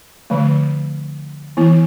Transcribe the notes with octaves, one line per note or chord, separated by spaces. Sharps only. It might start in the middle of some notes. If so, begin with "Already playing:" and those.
D3 F3 A3
E3 B3 E4